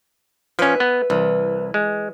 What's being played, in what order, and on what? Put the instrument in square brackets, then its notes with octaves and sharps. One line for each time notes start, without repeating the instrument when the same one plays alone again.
[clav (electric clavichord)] F3 C#4 [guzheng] B4 E5
[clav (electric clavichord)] B3
[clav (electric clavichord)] C2 [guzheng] E3
[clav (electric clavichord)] G#3